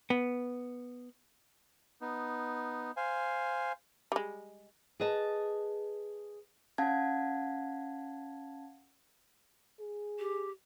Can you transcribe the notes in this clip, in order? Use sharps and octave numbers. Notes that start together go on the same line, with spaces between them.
B3
B3 D#4
C5 F5 G#5
G3 G#3
G#4 B4 D#5 A5
C#4 F5 F#5 A5 G#6
G#4
G4